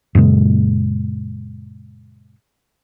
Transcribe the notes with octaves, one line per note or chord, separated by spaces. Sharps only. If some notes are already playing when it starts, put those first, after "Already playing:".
F#2 A#2 C#3 G#3